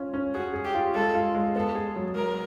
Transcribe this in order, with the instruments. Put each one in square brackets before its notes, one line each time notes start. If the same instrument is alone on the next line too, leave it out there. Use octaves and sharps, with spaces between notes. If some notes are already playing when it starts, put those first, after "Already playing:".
Already playing: [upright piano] C#4 F4
C#4
[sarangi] F#4 [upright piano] G#4
[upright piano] G#4
[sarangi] G4
[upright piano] F4
[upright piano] G#3 [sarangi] A4
[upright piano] F4
G#3
[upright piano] B3 [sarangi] A4
[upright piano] G#4
F#3
[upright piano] F#3 [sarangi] A#4